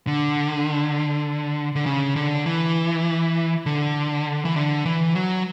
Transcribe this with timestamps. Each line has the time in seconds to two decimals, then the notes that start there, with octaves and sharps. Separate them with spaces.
0.07 D3
1.76 D3
1.86 C#3
2.16 D3
2.46 E3
3.66 D3
4.45 E3
4.56 D3
4.86 E3
5.15 F#3